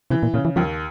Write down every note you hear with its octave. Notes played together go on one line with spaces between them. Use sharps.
C3 E3
A#2
A#2 C#3
E3
D#2 F3